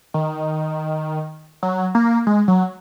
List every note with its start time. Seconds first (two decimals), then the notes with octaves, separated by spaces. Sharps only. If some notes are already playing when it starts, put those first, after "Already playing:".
0.14 D#3
1.63 F#3
1.95 A#3
2.27 G#3
2.48 F#3